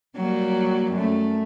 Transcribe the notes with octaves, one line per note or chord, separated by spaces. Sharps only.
F#3 G3 A#3
F#2 A3